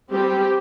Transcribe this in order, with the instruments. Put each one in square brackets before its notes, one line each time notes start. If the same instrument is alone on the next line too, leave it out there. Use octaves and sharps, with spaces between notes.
[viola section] G3 C4 G4